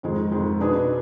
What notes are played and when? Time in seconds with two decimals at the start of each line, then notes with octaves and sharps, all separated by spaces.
0.03 F2 D#3 G#3
0.32 F2 D#3 G#3
0.60 B2 B3 D4 G#4